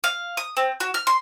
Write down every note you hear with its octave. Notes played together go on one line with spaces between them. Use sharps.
F5
D#6
C4
F#4
F6
C6